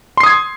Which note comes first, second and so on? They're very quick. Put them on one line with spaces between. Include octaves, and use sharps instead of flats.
C6 C7 D#6 G#6